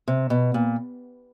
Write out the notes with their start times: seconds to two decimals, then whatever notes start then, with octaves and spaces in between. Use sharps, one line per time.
0.08 C3
0.30 B2
0.54 A#2